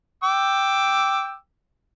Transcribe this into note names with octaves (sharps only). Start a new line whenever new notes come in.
G5 D6 E6